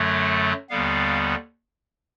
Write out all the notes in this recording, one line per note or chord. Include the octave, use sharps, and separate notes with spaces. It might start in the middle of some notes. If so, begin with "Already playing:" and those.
Already playing: F#2 D3 F#3 A3
D#2 D3 G3 B3 F5